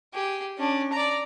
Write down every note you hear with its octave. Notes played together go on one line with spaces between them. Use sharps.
G4 G#4
C#4 D4
D5 A#5